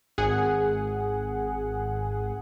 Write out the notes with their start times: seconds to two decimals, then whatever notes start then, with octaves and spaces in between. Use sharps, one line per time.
0.18 G#1 G#4 F#5